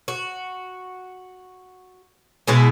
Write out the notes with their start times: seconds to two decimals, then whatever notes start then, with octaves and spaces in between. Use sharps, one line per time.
0.08 F#4
2.48 B2 G#3 E4